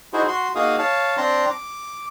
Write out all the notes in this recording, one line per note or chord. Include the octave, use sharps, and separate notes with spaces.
D#4 E4 F#4 G#4 C5
F#4 C6
A#3 D#4 F#4 G#4 F5 D#6
C#5 F5 A5
C4 D4 A#5 C6
D6